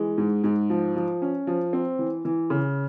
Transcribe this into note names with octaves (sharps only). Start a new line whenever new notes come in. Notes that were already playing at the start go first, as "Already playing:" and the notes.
Already playing: E3 G#3
G#2
G#2
F3
F3
C#4
F3
C4
E3
E3
C#3